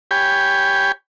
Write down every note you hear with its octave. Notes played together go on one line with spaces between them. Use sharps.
G4 C#5 G5 G#5 B5